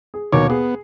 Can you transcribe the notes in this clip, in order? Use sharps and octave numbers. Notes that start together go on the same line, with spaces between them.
G#4
D#2 B2 D#3 C#5 D6
B3 G#4